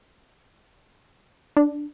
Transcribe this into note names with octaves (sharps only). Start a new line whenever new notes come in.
D4